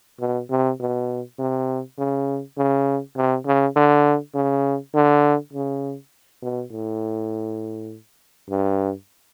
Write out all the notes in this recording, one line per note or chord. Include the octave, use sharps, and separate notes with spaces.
B2
C3
B2
C3
C#3
C#3
C3
C#3
D3
C#3
D3
C#3
B2
A2
G2